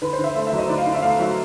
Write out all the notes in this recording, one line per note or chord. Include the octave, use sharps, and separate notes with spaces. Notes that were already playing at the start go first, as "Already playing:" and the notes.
D3 B4
C5
D3
E5
A3 E5
E5
F#3
D#5
D3 D5
F5
D3
E5
A3 F5
F#3 E5